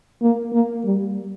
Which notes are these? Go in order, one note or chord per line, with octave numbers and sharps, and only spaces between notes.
A#3
A#3
G3